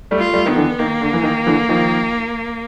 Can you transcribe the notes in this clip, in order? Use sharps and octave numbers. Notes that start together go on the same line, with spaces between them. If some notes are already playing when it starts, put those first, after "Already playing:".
G3 A3
F4
G3 A3
D#3 B3
D3 E3
D#3 A#3
D3
E3
D#3
D3 E3
D#3 F3